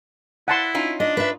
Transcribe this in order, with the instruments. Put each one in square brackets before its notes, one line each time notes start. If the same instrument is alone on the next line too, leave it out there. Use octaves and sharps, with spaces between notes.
[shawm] E4 [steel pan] F#5 A5 C6
[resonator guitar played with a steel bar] C#4 D#4 F4
[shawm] D4 [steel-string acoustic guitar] D#5
[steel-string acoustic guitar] B4 E5